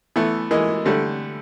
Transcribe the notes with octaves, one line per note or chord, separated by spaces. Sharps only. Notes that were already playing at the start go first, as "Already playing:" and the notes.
E3 A3 B3
E3 G#3 A#3
D3 G3 A3